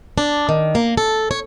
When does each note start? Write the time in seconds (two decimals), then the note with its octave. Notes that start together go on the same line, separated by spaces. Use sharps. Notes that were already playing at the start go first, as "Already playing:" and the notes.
0.18 D4
0.49 D#3
0.75 A#3
0.97 A4
1.31 C#5